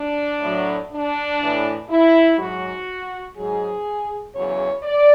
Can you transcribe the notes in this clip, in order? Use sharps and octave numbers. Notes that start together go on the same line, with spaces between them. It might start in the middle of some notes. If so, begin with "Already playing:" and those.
Already playing: D4
A2 F#3
D4
A2 E3
E4
G#2 F#3 F#4
G#2 F#3 G#4
E2 C#3 F#3 C#5
D5